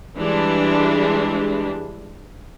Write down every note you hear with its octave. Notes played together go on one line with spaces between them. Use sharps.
E3 G3 G#3 D4